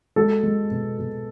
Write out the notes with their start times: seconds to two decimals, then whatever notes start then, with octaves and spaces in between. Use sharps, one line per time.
0.16 G#3 F#4 A4
0.43 G#3
0.71 B2
0.99 B2